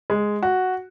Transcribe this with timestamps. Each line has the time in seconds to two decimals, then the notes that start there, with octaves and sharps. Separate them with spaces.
0.10 G#3
0.43 F#4